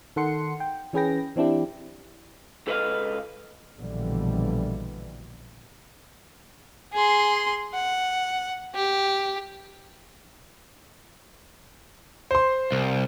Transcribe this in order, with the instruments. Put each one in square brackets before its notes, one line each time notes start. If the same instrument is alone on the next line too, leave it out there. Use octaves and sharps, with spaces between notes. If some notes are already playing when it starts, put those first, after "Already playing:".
[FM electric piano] D#3 A4 F#5 C6 C#7
G5
E3 C#4 G#4 B4 G5 A#6
E3 C4 D4 E4 G4
[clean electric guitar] C#2 A4 B4 D5 D#5 F5
[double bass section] A#1 B2 D3 E3 G3
[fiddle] G#4 C6
F#5
G4
[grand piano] C5 C6
[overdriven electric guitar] C2